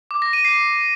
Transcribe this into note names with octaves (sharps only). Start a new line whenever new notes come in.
D6
A#6
D#7
C7